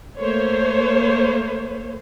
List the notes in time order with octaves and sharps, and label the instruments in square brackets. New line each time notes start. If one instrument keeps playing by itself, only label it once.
[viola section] A3 A#3 C5 C#5